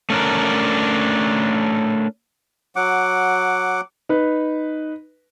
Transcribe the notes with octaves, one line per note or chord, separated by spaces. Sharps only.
A3 C#4 D4 A#4
F#3 F#5 D6
D#4 B4